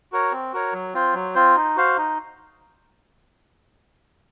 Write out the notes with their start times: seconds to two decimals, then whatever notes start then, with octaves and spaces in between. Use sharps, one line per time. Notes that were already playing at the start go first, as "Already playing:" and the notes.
0.12 F#4 A#4 C#5
0.32 C4
0.53 F#4 A#4 C#5
0.73 F#3
0.94 C4 F4 C5
1.14 F#3
1.35 C4 F4 C5
1.56 D#4
1.76 F#4 C5 F5
1.98 D#4